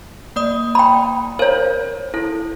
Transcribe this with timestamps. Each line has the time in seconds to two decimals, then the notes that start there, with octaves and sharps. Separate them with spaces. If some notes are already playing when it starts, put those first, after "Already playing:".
0.36 A#3 D5 D#6
0.75 G5 B5
1.39 A#4 C5 C#5
2.14 E4 A4